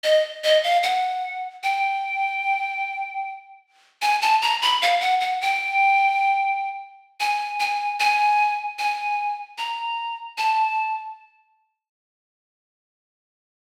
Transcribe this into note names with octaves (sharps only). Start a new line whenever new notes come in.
D#5
D#5
F5
F#5
G5
G#5
A5
A#5
B5
F5
F#5
F#5
G5
G#5
G#5
G#5
G#5
A#5
A5